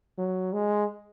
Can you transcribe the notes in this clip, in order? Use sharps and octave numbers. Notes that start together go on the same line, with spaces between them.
F#3
G#3